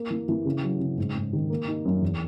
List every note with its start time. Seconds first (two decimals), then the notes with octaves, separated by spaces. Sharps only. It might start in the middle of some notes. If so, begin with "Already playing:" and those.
Already playing: A#3
0.10 E3
0.29 E3
0.45 C#3
0.64 F#3
0.80 C#3
0.98 G#2
1.15 G#2
1.33 D#3
1.50 A#3
1.68 D#4
1.85 F#2
2.02 E2